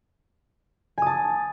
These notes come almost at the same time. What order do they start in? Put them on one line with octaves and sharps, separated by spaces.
G#5 D#6 A5